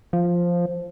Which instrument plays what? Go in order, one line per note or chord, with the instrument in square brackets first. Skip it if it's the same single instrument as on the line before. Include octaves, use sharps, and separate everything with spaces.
[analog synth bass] F3